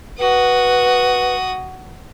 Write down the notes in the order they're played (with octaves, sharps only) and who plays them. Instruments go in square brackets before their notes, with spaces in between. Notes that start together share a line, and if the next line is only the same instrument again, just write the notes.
[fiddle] F#4 D#6 [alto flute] B4